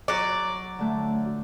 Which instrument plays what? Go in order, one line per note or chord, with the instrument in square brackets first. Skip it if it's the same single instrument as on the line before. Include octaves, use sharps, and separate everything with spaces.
[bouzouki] F#3 D5
[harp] D3 A3